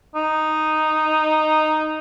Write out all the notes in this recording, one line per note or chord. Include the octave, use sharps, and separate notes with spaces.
D#4